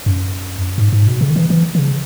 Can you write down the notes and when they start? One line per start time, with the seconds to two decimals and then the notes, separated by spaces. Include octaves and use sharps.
0.06 F#2
0.78 G#2
0.93 G#2
1.07 B2
1.21 C#3
1.30 D#3
1.36 E3
1.50 E3
1.75 D#3
1.79 C#3